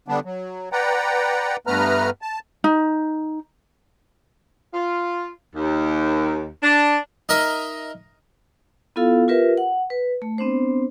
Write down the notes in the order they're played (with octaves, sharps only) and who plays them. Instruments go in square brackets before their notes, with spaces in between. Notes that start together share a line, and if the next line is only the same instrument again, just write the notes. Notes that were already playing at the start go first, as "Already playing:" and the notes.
[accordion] D3 G3 B3 D4
F#3
B4 D5 F#5 G5 A#5
G2 A3 B3 B4 A#5 F6
A5
[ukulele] D#4
[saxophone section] F4
D#2
D4
[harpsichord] D#4 A#4 D#5 E5
[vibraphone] B3 E4 F4 A4 F5
F4 G4 A#4 B4 E5
F#5
B4
A3
B3 C4 D4 C5